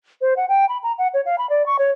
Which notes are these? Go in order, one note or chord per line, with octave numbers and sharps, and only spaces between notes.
C5
F#5
G5
B5
A#5
F#5
C#5
F5
B5
D5
C#6
C#5